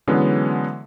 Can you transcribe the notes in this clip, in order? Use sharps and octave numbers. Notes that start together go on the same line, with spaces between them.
D3 E3 F#3 G#3 B3 C#4